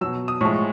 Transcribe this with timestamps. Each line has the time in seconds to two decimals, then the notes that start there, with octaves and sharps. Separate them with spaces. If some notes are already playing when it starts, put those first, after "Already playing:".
0.01 B2 F#3 E6
0.28 D#6
0.41 A2 F3 G#3 C#6